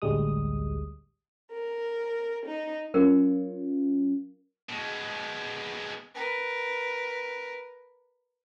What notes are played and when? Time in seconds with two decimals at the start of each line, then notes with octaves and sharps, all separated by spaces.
0.02 A1 D2 G3 G#3 D#6
1.51 A#4
2.46 D#4
2.94 F#3 C#4 F4 A#4
4.69 B2 G#3
6.15 A#4 B4